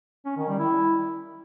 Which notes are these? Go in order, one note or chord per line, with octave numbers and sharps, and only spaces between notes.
C#4
D#3
G3
E4